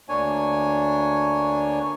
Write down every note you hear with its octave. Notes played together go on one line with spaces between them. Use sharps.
D2 A#3 D4 C#5 G#5